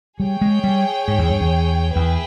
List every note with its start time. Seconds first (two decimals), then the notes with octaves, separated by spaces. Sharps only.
0.20 G3 G#4 C#5 G5
0.41 G#3
0.64 G3
1.08 G#2
1.18 E2
1.30 G2
1.41 E2
1.95 E2 G#4 B4 E5 G5